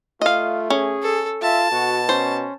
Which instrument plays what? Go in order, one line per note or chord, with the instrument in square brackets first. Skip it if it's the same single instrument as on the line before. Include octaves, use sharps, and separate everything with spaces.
[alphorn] A3 [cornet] F4 [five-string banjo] D#5 F5
[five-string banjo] C#4 [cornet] G#4
[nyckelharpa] A4
[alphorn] F4 [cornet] E5 [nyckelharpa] A5
[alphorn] B2 [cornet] F#4
[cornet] C#4 [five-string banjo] C5